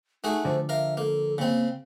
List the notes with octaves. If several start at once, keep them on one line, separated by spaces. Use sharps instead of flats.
A3 D#4 F#4 G#4
D3 F3 C5
A#4 E5 F5
A#3 A4
C#3 A#3 C4